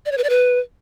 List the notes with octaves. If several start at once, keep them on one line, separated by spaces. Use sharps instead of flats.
D5
C#5
B4
D5
B4